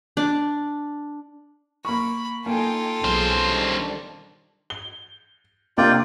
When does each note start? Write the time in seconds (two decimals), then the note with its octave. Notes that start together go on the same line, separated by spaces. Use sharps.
0.17 D4
1.85 A#3 B5 C#6
2.46 A#3 D#4 F4 A4 G5 G#5
3.04 B1 G#2 C#4 G#4 C5
3.46 D#3 G3 D4
4.70 G7
5.78 C3 A#3 D4 F4 D5 G5